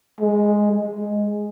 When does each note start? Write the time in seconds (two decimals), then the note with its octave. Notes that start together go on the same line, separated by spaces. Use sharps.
0.21 G#3
0.72 G#3